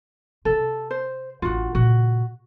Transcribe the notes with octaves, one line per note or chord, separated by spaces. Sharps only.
C3 A4
C5
A1 D4 F4 F#4
A#2 C#3 F#4